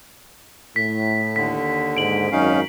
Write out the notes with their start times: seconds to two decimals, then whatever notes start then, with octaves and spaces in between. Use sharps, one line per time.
0.76 A2 B6
1.36 D#2 D3 B6
1.97 G#2 D7 F#7
2.32 G#1 F#2 C#4 D#4 F5